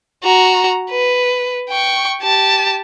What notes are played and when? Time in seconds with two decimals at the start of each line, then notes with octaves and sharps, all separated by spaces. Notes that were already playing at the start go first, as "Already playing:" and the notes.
0.24 F#4 A#5
0.90 B4
1.69 G5 C#6
2.23 G4 A5